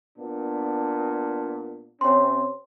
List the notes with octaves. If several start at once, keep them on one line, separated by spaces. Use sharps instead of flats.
A#2 B3 D4
C3 C4 C#4 C#5 C6